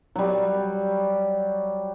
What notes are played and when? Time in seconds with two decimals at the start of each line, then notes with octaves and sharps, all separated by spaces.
0.16 F#3 G3